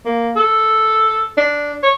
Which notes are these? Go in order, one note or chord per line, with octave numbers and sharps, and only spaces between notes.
A#3
A4
D4
C#5